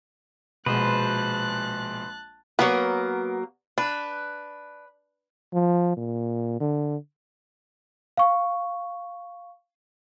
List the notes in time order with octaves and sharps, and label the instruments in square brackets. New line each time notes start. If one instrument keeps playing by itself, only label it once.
[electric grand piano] A#1 G#3 [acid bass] B2 [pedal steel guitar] B4 C5 [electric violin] A5 F#6
[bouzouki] F#3 A#3 A#4 [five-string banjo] B3 B4
[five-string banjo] D4 [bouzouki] B4
[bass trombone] F3
A#2
D3
[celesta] F5 C#6